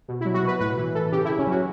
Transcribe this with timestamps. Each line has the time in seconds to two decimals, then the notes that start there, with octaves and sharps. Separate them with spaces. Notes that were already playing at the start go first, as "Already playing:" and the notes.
0.08 B2
0.21 E4
0.25 F#3
0.34 F#4
0.43 B2 B4
0.60 A2 B4
0.78 E3
0.95 E3 A4
1.12 C#3 G4
1.25 E4
1.30 C#3
1.39 C#4
1.47 F#3 F#4